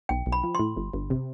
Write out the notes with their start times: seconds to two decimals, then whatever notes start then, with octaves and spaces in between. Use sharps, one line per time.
0.09 B1 G5
0.26 B1
0.32 B5
0.43 F3
0.55 A2 C6
0.76 G1
0.93 G1
1.10 C3